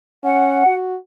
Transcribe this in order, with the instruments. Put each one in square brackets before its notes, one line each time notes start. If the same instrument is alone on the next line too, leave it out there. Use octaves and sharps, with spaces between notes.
[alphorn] C#4 [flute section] F#5
[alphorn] F#4